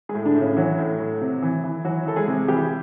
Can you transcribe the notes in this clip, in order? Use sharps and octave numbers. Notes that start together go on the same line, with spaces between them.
G#3 G#4
A2
D3 D4
A2
C#3 C#4
E3 F#3 F#4
A2
A2
C3
E3
E3
E3 F#3 F#4
E3 A4
G#3 G#4
C3
E3 G3 G4